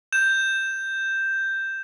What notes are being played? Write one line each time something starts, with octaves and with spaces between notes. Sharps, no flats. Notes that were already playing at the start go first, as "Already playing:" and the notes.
G6 E7